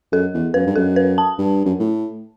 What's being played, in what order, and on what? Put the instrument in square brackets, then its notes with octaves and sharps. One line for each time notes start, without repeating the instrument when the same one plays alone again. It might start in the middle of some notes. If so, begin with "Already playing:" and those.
[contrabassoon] F#2 [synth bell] A4
[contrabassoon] E2
[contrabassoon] F#2 [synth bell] B4
[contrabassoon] G2
[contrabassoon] F#2 [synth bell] A4
[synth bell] B4
A5
[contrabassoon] G2
F#2
A2